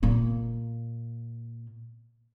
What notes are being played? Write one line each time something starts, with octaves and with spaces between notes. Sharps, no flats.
A#2 A#3